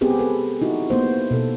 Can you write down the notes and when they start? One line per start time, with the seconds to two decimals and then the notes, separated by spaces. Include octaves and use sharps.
0.01 B3 C4 G4 G#4 B4
0.19 A4 B4
0.62 D#4 E4 F#4
0.90 A#3 B3 C5
1.31 B2 A4